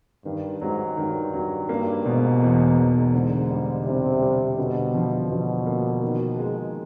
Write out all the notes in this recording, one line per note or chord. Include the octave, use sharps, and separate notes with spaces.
G2 D#3
G#2 F#3
G2 D#3
F#3
G2 A#3
G#2 B2
E2
E2
G#2 D3
G3
C3 G3
G3
B2 D3
F3
B2 F3
A#3
D#3
G#3